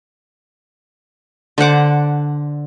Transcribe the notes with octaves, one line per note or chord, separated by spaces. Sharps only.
D3 C5 F#5 D6